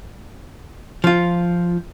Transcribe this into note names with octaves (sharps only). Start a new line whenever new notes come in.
F3 F4